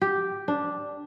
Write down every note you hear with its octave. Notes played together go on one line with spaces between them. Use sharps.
G4
D4